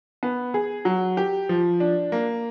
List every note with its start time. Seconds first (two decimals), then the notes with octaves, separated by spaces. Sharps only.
0.23 B3
0.54 G#4
0.85 F#3
1.17 G4
1.49 F3
1.80 D4
2.12 A#3